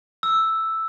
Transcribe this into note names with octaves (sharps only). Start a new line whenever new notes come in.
E6